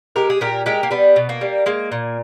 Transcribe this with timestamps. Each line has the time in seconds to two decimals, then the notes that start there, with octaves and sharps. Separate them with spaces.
0.16 G#3 G4 A#4
0.30 G#4
0.41 A#2 G4 A#4
0.66 G#3 G4 A#4
0.83 A#3
0.91 G3 B3
1.16 B2
1.29 A#3
1.41 G3
1.66 G#3 A#3
1.92 A#2